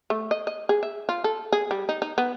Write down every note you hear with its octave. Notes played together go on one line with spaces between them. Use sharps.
A3
D#5
D#5
G#4
E5
F4
A4
G#4
G3
D#4
D#4
B3